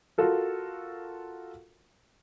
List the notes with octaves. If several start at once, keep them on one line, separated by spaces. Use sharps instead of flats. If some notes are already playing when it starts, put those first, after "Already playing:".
F4 F#4 A4 A#4